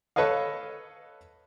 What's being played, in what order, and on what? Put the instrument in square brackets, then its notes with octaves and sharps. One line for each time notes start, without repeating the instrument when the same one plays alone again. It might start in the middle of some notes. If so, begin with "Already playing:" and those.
[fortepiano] A4 B4 C#5 D#5 F5